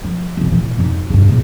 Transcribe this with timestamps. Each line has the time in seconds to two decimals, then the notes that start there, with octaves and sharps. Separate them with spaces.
0.04 F3
0.37 F1 C#2
0.52 A#2 E3
0.78 F2 D#4
1.10 G2 C#3
1.28 E2 A#2